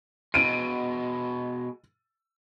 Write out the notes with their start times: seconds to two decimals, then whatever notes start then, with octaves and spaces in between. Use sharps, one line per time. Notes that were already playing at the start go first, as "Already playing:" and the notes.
0.34 B2 G#3 D7 D#7